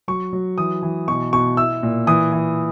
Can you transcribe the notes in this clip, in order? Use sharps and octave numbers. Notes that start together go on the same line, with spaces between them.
F#3 C#6
F#3
E3 D#6
E3
B2 C#6
B2 C#6
E4 E6
A#2
E3 D#6
E3